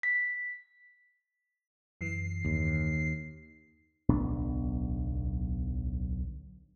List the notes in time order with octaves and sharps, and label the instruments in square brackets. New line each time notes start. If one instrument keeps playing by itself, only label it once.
[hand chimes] B6
[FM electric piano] F#2 E3 [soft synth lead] C7
[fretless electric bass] D#2
[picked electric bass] D1 B1 B3 D4